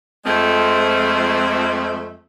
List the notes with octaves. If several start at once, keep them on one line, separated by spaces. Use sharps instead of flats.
F2 F3 G#3 A3 C4